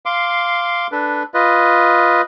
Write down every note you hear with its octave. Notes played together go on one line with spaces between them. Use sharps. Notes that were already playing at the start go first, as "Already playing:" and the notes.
F5 C6 D6
D4 A4 B4
F4 B4 D#5